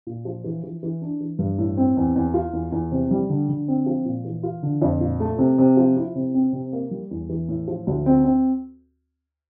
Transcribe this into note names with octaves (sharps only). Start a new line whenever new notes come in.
A#2
F3
E3
E3
E3
D4
E3
G2
A2
C4
E2
E2
F4
E2
E2
C3
G3
D3
D3
C4
F3
A#2
E3
F4
D3
F2
A#2
A3
C3
C3
F3
E4
C3
C4
C3
A#3
G3
E2
E3
A2
F3
D2
C4
C4